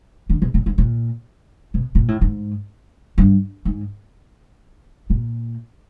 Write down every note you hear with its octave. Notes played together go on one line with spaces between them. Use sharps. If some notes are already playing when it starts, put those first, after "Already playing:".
D3
B2
A#2
G#2
A#2
B2
A#2
A2
G#2
G2
G#2
A#2